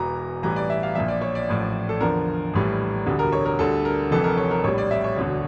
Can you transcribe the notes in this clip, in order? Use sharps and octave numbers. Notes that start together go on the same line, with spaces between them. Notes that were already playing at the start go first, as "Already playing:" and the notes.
Already playing: E1 E2 E3 A#5
A1 A2 E3 G3 A#5
D5
E5
F5
A#1 A#2 F3 E5
D5
C#5
D5
A1 A2 F3
A4
E2 D3 F3 A#4
A#1 A2 E3 G3
E1 D2 D3 G3
A#4
C#5
A#4
D2 D3 G3 A4
A#4
F1 F2 E3 A4
A#4
C#5
A#4
A#1 A2 G3 C#5
D5
E5
C#5
E1 D2 D3